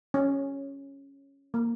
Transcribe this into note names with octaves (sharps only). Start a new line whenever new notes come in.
C#4
A#3